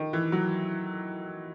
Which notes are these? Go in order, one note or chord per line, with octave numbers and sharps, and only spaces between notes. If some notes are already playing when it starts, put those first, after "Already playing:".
Already playing: D#3
E3
F#3